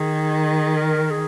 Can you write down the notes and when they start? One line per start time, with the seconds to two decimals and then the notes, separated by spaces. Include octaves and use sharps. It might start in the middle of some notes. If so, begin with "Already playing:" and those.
Already playing: D#3 G#4
0.76 A#4
1.11 G#4